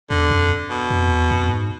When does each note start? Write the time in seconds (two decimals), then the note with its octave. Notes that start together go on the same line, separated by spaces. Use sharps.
0.10 E2 D3
0.31 F2
0.70 B2
0.90 F2
1.10 E2
1.31 F2
1.50 G#2